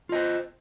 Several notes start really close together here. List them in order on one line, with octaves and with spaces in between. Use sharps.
F4 D#5 C5